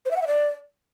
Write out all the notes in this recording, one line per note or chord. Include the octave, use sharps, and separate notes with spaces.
C5
E5
F#5
E5
D5